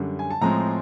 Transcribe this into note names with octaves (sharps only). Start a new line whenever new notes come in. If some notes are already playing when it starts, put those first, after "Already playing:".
Already playing: F#2 D3 G3
G#5
A5
A2 F3 G#3 C4 A#5